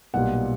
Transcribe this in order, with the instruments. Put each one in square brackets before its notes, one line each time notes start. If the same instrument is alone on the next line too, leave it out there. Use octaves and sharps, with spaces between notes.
[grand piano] B1 A#2 G3 F#5